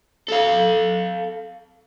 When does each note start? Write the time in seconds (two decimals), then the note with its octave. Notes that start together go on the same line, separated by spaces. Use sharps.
0.28 A4 F5